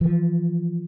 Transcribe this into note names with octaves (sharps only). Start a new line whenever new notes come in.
E3 F3